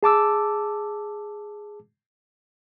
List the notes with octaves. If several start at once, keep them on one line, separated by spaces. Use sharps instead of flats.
G#4 A5 D6 E6